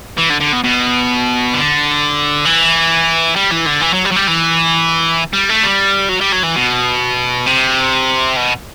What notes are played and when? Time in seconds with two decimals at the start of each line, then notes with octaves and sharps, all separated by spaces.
0.18 E3
0.30 D3
0.40 D3
0.52 B2
0.64 B2
1.54 D3
2.45 E3
3.36 G3
3.52 E3
3.67 D3
3.82 E3
3.94 F#3
4.05 G3
4.12 F#3
4.16 G3
4.27 E3
5.33 G3
5.49 A3
5.63 G3
6.09 F#3
6.21 G3
6.33 F#3
6.43 E3
6.56 B2
7.46 C3
8.37 B2